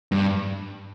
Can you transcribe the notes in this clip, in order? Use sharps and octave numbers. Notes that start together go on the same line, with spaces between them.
G2